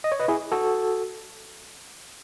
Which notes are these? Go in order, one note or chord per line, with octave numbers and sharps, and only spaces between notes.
D#5
C#5
B4 D#5
E4 G#4
F#4 A4